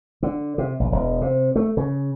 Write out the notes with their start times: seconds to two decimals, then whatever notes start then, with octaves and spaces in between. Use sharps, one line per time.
0.23 D3
0.58 C3
0.80 A#1
0.92 E1
1.21 C3
1.56 A3
1.77 C#3